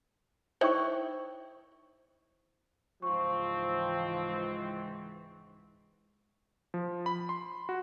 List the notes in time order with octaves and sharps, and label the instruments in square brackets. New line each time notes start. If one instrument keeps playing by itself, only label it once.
[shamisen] D#4 E4 [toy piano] C5 G5 C#6
[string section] C#2 G#2 E3 [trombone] F3 [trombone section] C4 [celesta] C#6
[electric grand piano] F3
B5
C6
F#4